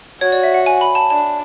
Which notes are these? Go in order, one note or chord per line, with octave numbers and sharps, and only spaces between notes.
F#4 C#5
D5
E5
F#5
G#5
B5
A5
D4 A5